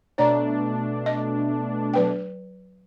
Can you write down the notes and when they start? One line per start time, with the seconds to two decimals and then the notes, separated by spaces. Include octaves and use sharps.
0.18 B2 A3 D4 C#5 D5 A#5
1.06 D#5
1.94 F#3 B4 G5